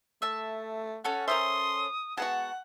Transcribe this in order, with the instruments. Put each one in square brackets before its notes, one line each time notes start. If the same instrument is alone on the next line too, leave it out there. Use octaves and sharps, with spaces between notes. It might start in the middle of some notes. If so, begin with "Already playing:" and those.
[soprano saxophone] A3 [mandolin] E5 A5
[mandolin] C#4 A4 C#5 [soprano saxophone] F#5
[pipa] A#4 C5 E5 [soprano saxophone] C6 [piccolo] D#6
[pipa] G#3 B3 F#4 [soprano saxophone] F#5 [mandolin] A5